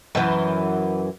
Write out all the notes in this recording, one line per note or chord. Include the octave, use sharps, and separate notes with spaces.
F#2 E3